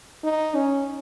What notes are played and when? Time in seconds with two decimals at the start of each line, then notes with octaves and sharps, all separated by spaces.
0.24 D#4
0.55 C#4